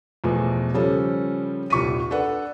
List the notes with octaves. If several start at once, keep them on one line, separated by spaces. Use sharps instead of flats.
E2 B2 F3 A3
C#3 F3 G3 C#4 A4
D#1 C2 C#6 B6 D#7
D4 A4 B4 F#5